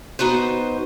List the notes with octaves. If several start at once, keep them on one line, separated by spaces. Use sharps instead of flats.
B3 D#4 F#4 B4 C5